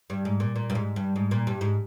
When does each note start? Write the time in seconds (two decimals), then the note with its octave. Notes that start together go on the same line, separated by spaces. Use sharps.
0.10 G2
0.25 G#2
0.40 A#2
0.56 A#2
0.70 G2
0.75 G#2
0.96 G2
1.16 G#2
1.31 A#2
1.47 G2
1.61 G#2